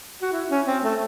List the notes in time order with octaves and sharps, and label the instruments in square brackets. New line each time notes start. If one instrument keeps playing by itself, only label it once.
[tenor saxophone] F#4
E4
C#4
C4
A3